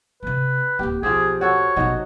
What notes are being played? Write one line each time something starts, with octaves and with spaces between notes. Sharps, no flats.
C3 A3 B4
D1 A#3 G4
B1 F3 C4 G4 G#4
F#4 A4 C#5
A1 B2 F#3 D#4